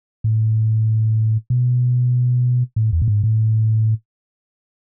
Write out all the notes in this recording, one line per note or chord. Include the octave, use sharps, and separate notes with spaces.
A2
B2
A2
E2
A2
G#2
A2